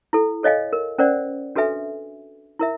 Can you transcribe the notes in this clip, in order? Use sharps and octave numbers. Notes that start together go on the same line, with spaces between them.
E4 A4
A4 C#5 D#5 F5 G#5
A#4
C#4 A#4 C5 D5 F#5
D4 F#4 A4 B4 E5 G#5
E4 A#4 E5